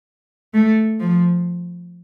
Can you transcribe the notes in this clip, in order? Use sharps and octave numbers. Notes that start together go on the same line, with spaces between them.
A3
F3